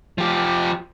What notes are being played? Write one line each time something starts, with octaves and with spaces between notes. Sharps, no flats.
F3 G4